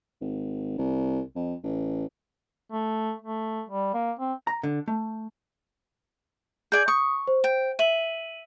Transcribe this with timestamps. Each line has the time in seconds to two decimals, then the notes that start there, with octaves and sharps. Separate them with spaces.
0.21 G#1
0.78 C2
1.36 F2
1.64 A1
2.72 A3
3.22 A3
3.69 G3
3.94 A#3
4.19 C4
4.47 A#5
4.63 D3
4.88 A3
6.72 G#4 D5 G#5 G6
6.88 C#6 D#6
7.28 C5
7.44 G5
7.79 E5 D#7 F#7